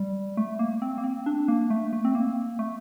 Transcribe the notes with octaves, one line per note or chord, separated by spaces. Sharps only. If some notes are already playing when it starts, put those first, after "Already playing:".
Already playing: G3
A3
A#3
C4
A#3
C4
D4
A#3
A3
A3
C4
A#3
A3